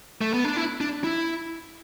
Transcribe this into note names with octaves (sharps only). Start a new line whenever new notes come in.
A3
B3
D4
E4
D4
E4